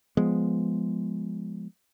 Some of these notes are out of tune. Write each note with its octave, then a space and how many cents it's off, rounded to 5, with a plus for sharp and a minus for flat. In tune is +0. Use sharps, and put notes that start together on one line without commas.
F3 +0 G#3 +0 B3 +0